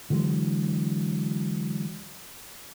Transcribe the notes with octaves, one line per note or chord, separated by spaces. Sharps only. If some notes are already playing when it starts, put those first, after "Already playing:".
D3 E3 F#3 G#3